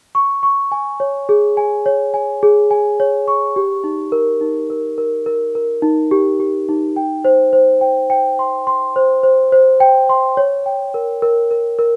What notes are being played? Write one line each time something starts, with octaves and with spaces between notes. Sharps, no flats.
C#6
C#6
G#5
C#5
G#4
G#5
C#5
G#5
G#4
G#5
C#5
C#6
G4
D#4
A#4
D#4
A#4
A#4
A#4
A#4
D#4
G4
G4
D#4
G5
C5
C5
G5
G5
C6
C6
C5
C5
C5
G5
C6
C#5
G5
A#4
A#4
A#4
A#4